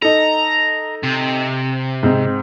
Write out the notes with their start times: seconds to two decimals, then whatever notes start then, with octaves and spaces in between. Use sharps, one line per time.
0.02 D#4 A4 A#5
1.03 C3
2.03 G#2 C4